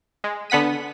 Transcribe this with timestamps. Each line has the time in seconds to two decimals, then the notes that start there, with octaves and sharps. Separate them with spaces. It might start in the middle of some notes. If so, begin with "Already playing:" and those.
0.24 G#3
0.50 D3 B3 F#5 B6 D#7